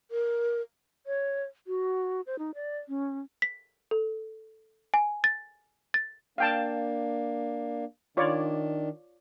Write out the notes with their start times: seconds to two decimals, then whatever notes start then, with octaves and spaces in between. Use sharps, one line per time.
0.11 A#4
1.07 C#5
1.67 F#4
2.27 C5
2.39 D#4
2.55 D5
2.89 C#4
3.42 B6
3.91 A4
4.94 G#5
5.24 A6
5.94 A6
6.38 A#3 D4 F5 G5 A5
8.17 D#3 D4 F4 C#5 D5